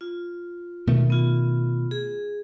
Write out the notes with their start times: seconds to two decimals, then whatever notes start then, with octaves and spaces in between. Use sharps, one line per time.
0.01 F4
0.87 B2 D#3 A3
1.10 B3 F4
1.91 G#4